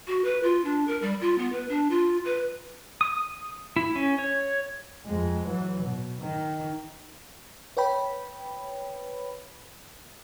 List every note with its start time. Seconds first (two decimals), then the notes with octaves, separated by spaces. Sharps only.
0.07 F#4
0.24 B4
0.43 F4
0.64 D4
0.87 A#4
1.02 G3
1.21 F4
1.38 B3
1.52 B4
1.69 D4
1.90 F4
2.25 B4
3.01 D#6
3.76 E4
3.96 C#4
4.19 C#5
5.06 F2 G#3
5.47 E3 F#3
5.83 B2
6.21 D#3
7.77 B4 C#5 G5 B5